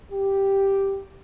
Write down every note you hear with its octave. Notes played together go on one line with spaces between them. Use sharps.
G4